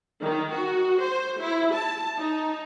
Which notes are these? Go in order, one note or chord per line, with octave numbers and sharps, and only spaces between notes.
D#3
F#4
C5
E4
A5
D#4